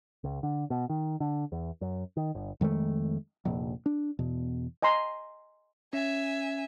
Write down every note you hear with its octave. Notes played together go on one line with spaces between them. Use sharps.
C#2
D3
B2
D#3
D3
E2
F#2
D#3
G1
F2 D#3 G#3 A3
F1 A#1
D4
E2 B2
D#5 G#5 A#5 C6
C#4 E5 G#5